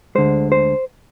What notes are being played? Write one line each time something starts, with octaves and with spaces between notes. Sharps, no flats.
D2 D3 G#3 C5
C5